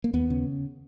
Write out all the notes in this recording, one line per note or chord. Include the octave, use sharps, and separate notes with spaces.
A#3
D#2 B3
C#3